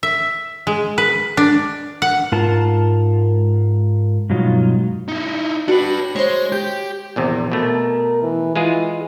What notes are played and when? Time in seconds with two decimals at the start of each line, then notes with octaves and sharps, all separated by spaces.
0.03 E5
0.67 G#3
0.98 B4
1.37 D4
2.02 F#5
2.32 G#2 F4 A#4 A5
4.30 G2 B2 F#3 G#3 D#4 F4
5.08 D#4 E4
5.68 D4 F#4 B4
6.16 G#3 C5 C#5
6.52 G4 G6
7.16 A#1 E2 C3
7.52 B2 A3 A#4
8.22 E3
8.56 E3 G#3 F4 G#4